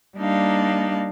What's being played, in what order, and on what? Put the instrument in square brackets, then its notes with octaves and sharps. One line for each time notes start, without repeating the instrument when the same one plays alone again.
[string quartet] G3 A#3 D4 D#4 F5